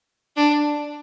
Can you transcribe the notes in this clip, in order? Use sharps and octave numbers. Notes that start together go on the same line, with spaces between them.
D4